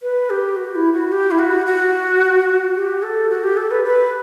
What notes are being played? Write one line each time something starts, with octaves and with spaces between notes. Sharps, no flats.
B4
G4
F#4
E4
F#4
G4
E4
F#4
F#4
G4
A4
F#4
G4
A4
B4
B4